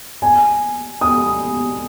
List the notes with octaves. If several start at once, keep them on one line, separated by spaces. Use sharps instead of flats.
G#5
D#6